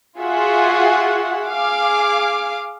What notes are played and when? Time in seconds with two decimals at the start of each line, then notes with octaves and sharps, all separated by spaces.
0.19 F4 F#4 G#4 E5 F#5
1.47 G#4 F5 D6